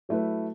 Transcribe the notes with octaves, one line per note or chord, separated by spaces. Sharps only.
F#3 A3 E4 B4